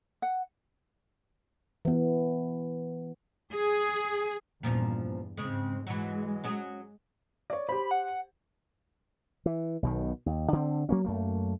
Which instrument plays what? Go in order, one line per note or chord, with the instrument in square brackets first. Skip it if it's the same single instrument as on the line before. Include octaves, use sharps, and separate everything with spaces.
[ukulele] F#5
[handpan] E3 B3
[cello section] G#4
[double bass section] E2 G2 [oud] A#2 F3 C#4
[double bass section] G#2 C4 [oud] C#3 G#3
[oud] E3 F#3 [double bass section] G#3
[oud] F#3 C#4 G#4
[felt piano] C#5 D5
[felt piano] G4 C5 [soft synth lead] B5
[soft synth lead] F#5
[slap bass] E3
B1 B2 D#3
D#2
D3 C4
F#3 A#3 C#4
F#2 A3 A#3